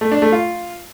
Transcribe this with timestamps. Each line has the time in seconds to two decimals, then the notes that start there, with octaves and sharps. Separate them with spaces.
0.01 A3
0.12 D4
0.22 A3
0.32 F4